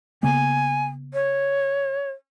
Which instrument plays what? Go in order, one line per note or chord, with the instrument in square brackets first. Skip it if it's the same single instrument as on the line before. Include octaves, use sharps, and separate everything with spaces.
[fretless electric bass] C#3 A#3 B3 [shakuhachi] G#5
[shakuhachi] C#5